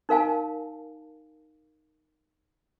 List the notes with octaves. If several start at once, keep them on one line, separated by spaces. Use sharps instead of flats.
D#4 A#4 F5 G#5 A5